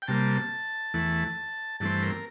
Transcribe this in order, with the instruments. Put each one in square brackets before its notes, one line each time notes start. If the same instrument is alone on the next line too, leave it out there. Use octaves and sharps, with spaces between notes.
[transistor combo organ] G5
C3 G3 A#3 A5
E2 E3 A3
G2 E3 A3 C4 A5
A#4